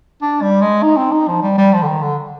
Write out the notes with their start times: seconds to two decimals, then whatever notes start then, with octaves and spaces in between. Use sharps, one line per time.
0.22 D4
0.42 G3
0.62 G#3
0.83 D#4
0.97 C4
1.12 D#4
1.28 F3
1.43 G3
1.58 G3
1.73 F3
1.83 D3
1.87 D#3
2.03 D3